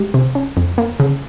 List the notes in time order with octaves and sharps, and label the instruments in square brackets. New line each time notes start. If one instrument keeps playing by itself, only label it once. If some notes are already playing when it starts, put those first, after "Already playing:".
Already playing: [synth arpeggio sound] G#3 G4
C3
C#4
F2
A#3
C#3